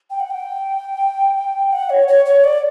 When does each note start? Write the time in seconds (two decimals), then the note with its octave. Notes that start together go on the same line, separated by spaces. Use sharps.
0.10 G5
0.20 F#5
0.30 G5
1.72 F#5
1.90 C#5
2.08 C#5
2.26 C#5
2.44 D5